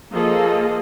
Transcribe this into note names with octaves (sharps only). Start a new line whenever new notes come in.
F3 A#3 F4 G#4 A4 D#5